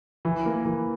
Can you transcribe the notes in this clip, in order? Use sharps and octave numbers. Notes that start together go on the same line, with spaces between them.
E3
A#3
E3